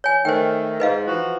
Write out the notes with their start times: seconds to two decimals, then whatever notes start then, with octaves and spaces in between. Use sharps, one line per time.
0.04 C#5 G#5
0.25 D#3 A3 C5 G5
0.80 G#2 B4 D#5 F5
1.07 E3 F3 F#4